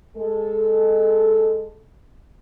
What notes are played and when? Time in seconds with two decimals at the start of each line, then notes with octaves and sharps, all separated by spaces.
0.17 G#3 A4